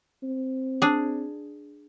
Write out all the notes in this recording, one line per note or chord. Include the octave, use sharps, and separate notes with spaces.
C4
D4 G#4